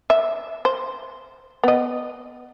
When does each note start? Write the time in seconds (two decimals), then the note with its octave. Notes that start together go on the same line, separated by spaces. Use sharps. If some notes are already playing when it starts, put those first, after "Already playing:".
0.10 E5
0.65 C5
1.64 B3 D#5